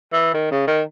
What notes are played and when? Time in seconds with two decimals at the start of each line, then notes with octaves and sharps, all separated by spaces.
0.12 E3
0.34 D#3
0.51 C#3
0.67 D#3